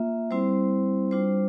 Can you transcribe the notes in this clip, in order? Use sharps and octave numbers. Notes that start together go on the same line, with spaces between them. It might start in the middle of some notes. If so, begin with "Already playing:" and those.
Already playing: A#3 F4 E5
G3 C4 E4 C5
G3 D4 F4 C5